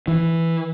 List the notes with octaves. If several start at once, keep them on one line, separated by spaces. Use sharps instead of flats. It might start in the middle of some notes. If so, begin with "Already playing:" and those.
E3